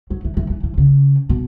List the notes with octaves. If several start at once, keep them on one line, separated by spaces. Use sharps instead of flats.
F#3
E3
E3
E3
E3
C#3
B2